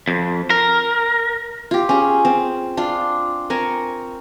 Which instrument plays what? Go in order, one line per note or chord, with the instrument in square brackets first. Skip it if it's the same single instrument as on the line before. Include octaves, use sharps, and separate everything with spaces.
[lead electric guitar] F2
A#4
[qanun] F4 G4
C#4 G#4
C4
D4 F4 C6
C4 A#4 G#5 C#6